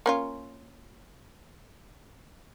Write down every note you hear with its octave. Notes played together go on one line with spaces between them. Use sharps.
A#3 C#4 F4